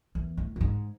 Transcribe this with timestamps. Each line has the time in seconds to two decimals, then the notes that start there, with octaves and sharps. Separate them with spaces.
0.15 E2
0.38 A2
0.56 A2
0.61 G#2